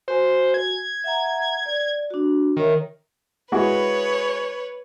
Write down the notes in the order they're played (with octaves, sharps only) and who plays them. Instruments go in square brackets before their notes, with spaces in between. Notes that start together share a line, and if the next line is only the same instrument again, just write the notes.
[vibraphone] F#4 G#5 [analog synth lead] C5
[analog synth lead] G#6
[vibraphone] E5 F#5 A#5
D5
D4 F#4
[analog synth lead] D#3 [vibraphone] A#4 C#5 E5
[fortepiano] G#3 E4 F#4 [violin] B4 C#5